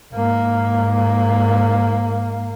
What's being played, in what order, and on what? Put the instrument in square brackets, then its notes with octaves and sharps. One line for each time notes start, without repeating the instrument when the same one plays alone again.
[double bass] G#2 A#3